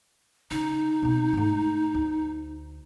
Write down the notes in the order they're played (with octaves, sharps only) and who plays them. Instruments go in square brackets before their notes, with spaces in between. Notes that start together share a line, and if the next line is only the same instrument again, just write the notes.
[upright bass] C#3 [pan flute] D#4
[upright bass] B2 C4
G#2 A3
D2